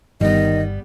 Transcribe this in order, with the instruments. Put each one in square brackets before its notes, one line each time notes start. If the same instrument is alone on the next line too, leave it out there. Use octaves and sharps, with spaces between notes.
[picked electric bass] G1 [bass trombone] D#3 [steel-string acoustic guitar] G3 B3 [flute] D#5